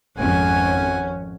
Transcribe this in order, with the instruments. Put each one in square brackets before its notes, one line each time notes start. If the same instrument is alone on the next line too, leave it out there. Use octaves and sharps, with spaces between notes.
[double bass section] G#1 F2 C#4 [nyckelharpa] F#5 G#5